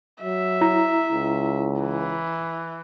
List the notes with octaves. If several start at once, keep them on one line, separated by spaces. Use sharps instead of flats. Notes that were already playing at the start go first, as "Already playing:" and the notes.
F#3 E5
E4 A#5
C#2
E3